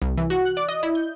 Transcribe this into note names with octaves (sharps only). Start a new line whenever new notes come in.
C2
E3
F#4
F#6
D5
D#5
E4
G6